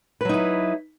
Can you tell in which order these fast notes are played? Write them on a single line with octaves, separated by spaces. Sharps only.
B4 F#3 D#4 E4